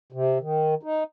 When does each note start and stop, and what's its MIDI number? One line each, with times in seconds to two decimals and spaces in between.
0.12 0.38 48
0.40 0.75 51
0.83 1.04 63